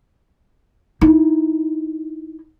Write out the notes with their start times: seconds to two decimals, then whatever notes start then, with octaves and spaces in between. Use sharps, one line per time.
1.01 D#4 E4